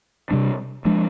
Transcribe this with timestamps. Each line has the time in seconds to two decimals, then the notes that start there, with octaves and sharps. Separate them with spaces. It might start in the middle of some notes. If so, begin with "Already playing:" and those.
0.31 C3 G3 D4
0.85 F3 G#3 D4